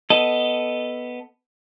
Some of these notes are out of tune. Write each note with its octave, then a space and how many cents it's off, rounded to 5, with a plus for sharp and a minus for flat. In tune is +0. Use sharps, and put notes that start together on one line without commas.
B3 +0 A4 +0 D#5 +0